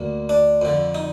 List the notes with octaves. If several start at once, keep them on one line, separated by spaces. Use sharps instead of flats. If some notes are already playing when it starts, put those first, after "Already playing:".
Already playing: D2 D3 A#3
D4
F2 D3
D#4